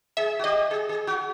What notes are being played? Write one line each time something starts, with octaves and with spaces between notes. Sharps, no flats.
G#4 E5
F#4
G4 D#5
G#4
G#4
F#4